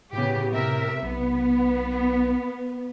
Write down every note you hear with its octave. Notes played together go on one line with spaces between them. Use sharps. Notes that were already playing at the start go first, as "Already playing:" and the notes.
A2 C#3 B3 G4
C3 A#4 E5
B1 B3